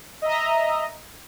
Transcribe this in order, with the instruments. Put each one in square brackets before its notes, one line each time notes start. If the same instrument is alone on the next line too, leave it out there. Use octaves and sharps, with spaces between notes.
[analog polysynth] D#5 E5 A#5